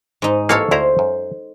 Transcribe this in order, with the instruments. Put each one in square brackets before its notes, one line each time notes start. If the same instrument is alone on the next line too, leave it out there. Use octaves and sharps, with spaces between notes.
[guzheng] G#2 D#4
[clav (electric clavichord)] A1 G#2 A#3 [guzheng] A4 C#5 F5
[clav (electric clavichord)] D2 E4 A#5 [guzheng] C5
[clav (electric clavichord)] F#2